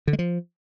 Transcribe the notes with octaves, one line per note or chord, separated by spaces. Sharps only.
D3
G#3
F3